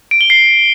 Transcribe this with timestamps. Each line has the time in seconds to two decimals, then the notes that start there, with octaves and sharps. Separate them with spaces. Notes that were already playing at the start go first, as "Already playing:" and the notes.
0.11 D7
0.21 G7
0.30 C7